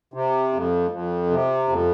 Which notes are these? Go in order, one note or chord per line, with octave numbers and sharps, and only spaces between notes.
C3
F2
F2
C3
F2